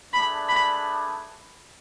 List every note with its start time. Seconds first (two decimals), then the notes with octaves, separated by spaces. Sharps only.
0.13 A3 D4 G#4 B4 D5 B5
0.49 B5